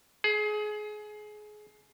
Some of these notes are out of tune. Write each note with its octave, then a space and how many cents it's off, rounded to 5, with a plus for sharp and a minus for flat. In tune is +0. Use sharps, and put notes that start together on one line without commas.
G#4 +25